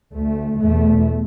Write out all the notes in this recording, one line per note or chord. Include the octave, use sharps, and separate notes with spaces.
D2 A3
E2 B2 A3